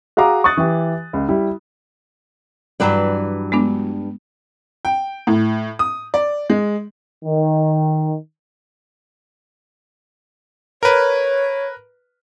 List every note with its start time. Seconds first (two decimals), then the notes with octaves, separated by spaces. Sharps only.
0.17 F#4 G#4 F5 A#5 D6 D#6
0.44 C#6 D#6 F#6 A6
0.57 E3 G4
1.13 C#2
1.29 G3 E4
2.80 G2 E3 F#3 B4 D5
3.52 G#3 B3 D4
4.85 G5
5.27 A2
5.79 D#6
6.14 D5
6.50 G#3
7.25 D#3
10.83 A#4 B4 C#5